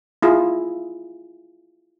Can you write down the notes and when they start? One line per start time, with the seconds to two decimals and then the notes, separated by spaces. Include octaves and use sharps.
0.22 E4 F4 G#4